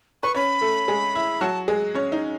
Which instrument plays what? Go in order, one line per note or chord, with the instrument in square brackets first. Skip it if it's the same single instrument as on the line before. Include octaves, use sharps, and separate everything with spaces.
[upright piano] B4 [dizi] C#6
[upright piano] C#4 C#5 [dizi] B5
[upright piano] A3 A4
G#3 G#4
E4
[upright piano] F#3 F#4 [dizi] A5
[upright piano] G#3 G#4
C#4 C#5
D#4